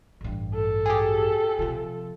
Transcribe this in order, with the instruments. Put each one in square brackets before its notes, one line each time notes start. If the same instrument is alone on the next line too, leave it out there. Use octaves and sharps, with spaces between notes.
[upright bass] A1 G2
[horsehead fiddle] A4
[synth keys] G4 G#4
[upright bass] C3 F3